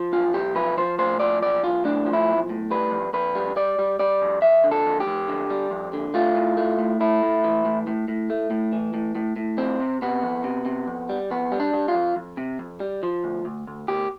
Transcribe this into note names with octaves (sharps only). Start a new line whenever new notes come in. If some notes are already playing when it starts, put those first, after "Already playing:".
Already playing: F3
B1 F4
B1 G4
F3 B4
F3 C5
A2 C5
F3 D5
B1 D5
B1 F4
A2 D4
F3
E4
B1
A2
G3 B4
F2
F2 B4
G3
G3 D5
G3
G3 D5
F2
F2 E5
D3
A4
F2
G4
F2
D3
G3
F2
D3
A3 F4
A2
A3
A2
A3 E4
A2
E3
A2
A2
A2
A3
A2
E3
A2
A2
A2
F2 C4
C3
C3 B3
F2
C3
C3
F2
G3
F2 B3
G3
D4
G3
F4
F2
F2
C3
F2
G3
F3
D2
D2
D2
D2 G4